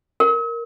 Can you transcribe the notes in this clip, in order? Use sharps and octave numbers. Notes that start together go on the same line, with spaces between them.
A#4